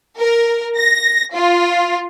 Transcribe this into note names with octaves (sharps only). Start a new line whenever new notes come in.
A#4
A#6
F4